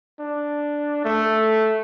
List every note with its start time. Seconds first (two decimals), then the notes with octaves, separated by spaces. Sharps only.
0.19 D4
1.04 A3